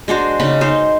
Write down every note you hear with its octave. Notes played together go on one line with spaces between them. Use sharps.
G#3 D4 F#4 C5
C#3 D#4 B5
D#4 C5